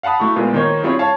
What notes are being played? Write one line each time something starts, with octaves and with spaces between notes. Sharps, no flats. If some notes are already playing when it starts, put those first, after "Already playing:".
F5 F#5 A5 B5 D#6
A3 E4 F#4 C#6
A#2 G#3 B3 F4
D#3 A#3 D#4 F4 C5 C#5
G3 C4 E4 F4 G#4 C#5
C#5 F5 A5